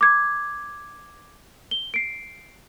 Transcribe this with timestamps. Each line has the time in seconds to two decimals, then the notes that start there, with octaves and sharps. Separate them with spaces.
0.01 D6 G#6
1.71 G7
1.94 C7 D7